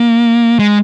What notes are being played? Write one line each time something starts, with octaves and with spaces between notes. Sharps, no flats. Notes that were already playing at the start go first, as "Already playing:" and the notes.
Already playing: A#3
G#3